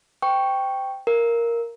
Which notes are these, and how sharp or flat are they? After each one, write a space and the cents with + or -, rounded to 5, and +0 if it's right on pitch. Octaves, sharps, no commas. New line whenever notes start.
C5 -25 G5 +0 C#6 +0
A#4 +0 F5 -25